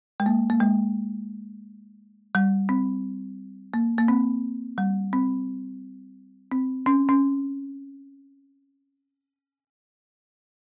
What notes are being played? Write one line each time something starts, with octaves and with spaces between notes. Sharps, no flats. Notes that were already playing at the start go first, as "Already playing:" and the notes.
G#3
A#3
A#3
G#3
G3
C4
A#3
A#3
C4
G3
C4
C4
C#4
C#4